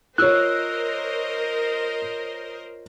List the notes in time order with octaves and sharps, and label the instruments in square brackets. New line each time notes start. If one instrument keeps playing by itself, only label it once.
[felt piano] F4 C#5 [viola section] A#4 C5 D#5 [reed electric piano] E6 F#6